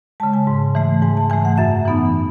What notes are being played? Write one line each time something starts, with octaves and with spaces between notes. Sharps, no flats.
C#3 G#3 A5
G#5
G#2
E3 A3
G#2 G#5
A5
E3 A3 G#5
F#5
F#2 E5
E3 B3 D#4